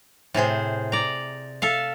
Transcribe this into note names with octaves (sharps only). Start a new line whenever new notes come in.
A2 C3 G#4 C5
D5 A#5
A4 E5 F5